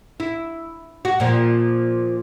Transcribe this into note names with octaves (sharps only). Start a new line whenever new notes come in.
E4
F#4
A#2 F3